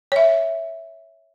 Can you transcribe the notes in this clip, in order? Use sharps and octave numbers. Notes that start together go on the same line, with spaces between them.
C#5 E5